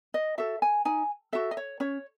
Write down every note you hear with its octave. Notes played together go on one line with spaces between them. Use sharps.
D#5
F#4 A4 E5
G#5
D#4 G#5
F#4 A4 E5
D#5
C#5
C#4 C#5